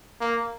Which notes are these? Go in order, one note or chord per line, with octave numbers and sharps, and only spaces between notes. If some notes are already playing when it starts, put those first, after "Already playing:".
A#3